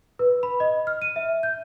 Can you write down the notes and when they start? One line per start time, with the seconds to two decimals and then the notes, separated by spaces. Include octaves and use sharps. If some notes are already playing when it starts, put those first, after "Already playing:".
0.19 B4
0.43 B5
0.60 D#5
0.87 F6
1.02 D#7
1.16 E5
1.43 G6